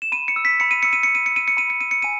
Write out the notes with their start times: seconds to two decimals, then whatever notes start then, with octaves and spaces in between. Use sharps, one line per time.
0.02 E7
0.12 B5 D#7
0.28 C#7
0.36 E6
0.45 B6
0.60 B5 C#7
0.71 D#7
0.83 E6 C#7
0.93 D#7
1.03 B5 C#7
1.15 D#7
1.26 C#7
1.32 E6 D#7
1.48 C#7
1.57 B5 D#7
1.70 C#7
1.80 E6 D#7
1.91 C#7
2.02 G#5 D#7